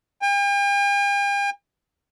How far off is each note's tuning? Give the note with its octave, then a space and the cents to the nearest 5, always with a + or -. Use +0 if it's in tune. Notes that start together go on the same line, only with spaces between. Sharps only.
G5 +45